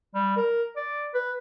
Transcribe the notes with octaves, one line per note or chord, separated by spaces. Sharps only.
G3
A#4
D5
B4